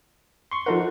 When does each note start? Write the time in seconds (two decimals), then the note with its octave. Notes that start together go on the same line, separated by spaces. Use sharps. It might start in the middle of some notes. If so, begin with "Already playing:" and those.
0.51 C6 C#6
0.66 F3 D#4 F4 A4 A#4 F#5